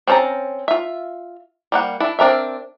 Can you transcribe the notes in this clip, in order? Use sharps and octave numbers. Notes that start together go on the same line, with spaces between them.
C4 C#4 C5 A5 A#5
F4 E5
G3 A#3 F#5
D4 E4
C4 D4 A#4 E5